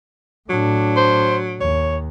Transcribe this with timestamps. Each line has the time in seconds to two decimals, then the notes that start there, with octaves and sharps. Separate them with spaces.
0.50 A2 F#3 D4
0.97 C5
1.61 D#2 C#5